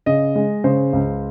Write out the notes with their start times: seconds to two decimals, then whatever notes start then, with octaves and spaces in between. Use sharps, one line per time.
0.06 C#3 D#5
0.36 G#3
0.64 C#3 C5
0.93 C#2